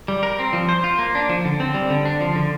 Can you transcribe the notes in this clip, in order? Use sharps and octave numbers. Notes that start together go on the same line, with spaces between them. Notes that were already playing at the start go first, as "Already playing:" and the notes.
G3
A#4
C4
F3
C5
F4
A#3
D4
F3
D3
C4
G3
D3
D4
F3
D3